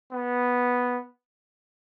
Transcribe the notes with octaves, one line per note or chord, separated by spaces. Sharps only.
B3